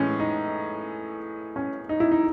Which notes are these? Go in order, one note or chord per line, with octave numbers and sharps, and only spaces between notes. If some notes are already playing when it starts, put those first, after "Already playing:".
Already playing: A2 E3 G#3 C#4
D#4
C#4
D#4
E4
D#4